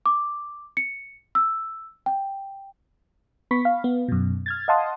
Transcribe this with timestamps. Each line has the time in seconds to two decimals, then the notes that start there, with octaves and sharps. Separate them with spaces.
0.06 D6
0.77 C#7
1.35 E6
2.06 G5
3.51 B3 B5 C#6 B6
3.65 F5
3.84 B3
4.08 F#2 B2
4.46 F6 G#6 A6
4.68 D#5 F5 F#5 A5 C6 D#6